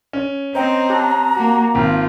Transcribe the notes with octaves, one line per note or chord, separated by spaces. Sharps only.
C#4
C4 C5 D#5 G5 A#5
G4 A5 F#6
A#3 F#4
G#1 F4 G5 B5 F6